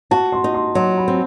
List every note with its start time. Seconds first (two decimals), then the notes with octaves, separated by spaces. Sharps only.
0.11 F#4 A5
0.32 C6
0.44 D#4
0.54 C6
0.75 F#3 C6
0.98 B5
1.08 C4